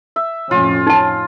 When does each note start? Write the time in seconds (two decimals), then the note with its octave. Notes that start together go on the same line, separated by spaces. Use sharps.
0.16 E5
0.51 F2 A2 C#4 F4
0.87 D#4 A5